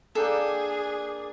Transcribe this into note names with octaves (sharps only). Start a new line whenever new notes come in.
A#3 D4 G#4 A4 G5